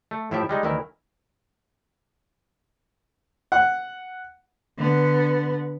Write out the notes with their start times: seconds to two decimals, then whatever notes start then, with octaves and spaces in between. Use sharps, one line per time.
0.11 A3
0.31 A2 F3 E4 G4 E5 G5
0.49 G3 G#3 D#4
0.63 D2 D#3 E3 E4 A#4
3.52 F#5
4.78 D3 B3